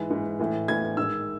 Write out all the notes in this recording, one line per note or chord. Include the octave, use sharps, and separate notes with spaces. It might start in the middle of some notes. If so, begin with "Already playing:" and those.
Already playing: G#2 E3
G#2 E3
A2 E3
A2 E3 G#6
G#2 D#3 E6